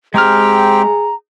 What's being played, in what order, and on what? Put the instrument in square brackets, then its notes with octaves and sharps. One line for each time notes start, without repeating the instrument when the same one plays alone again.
[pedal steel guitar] G#3 F6 [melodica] C4 G4 G5 [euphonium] G#4 [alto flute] A#5